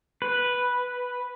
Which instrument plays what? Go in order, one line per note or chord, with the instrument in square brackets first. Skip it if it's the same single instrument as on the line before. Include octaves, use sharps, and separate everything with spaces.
[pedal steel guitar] B4